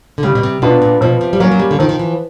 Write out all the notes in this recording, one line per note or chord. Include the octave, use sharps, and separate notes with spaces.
D3
C#3 G3
B2
C3
B2 B3 D4 F4
A#2
B2 F3
C3
G3
F#3 A#3 C#4
F#3
G3
D3
D#3 F3
D#3
E3